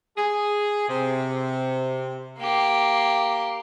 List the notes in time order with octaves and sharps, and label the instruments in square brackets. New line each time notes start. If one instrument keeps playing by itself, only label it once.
[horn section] G#4
C3
[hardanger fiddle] A#3 G4